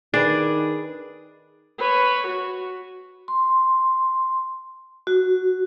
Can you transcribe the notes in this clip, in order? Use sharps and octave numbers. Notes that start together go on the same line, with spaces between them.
D#3 D4 G#4 B4 D5
B4 C#5
F#4
C6
F#4